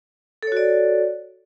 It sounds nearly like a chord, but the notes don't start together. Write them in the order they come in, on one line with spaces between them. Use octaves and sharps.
A4 C#5 F#4 D5